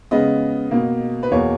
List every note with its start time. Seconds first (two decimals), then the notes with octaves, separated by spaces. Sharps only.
0.11 C#3 G#3 B3 D#5
0.71 B2 A#3
1.23 B4
1.31 E2 B2 A#3 C#5